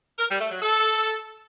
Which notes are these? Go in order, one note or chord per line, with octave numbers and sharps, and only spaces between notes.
A#4
G3
A3
F#3
A4